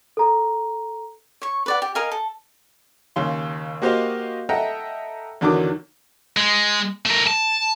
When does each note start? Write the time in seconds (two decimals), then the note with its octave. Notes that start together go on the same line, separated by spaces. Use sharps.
0.17 A4 A#5
1.42 C#5 C#6
1.66 B4 D5 F#5
1.82 G4
1.95 A#4 D#5 F5 G#5
2.12 A4
3.16 D#2 C#3 C6
3.82 A#3 F#4 G4 C5 D#5 F5
4.49 A4 D#5 E5 F#5 G5 A#5
5.41 E2 D3 D#3 F#3 D6
6.37 G#3
7.06 A3 A#4
7.27 A5